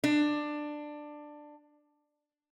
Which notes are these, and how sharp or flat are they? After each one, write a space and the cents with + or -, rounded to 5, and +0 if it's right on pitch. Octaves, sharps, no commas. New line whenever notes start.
D4 +15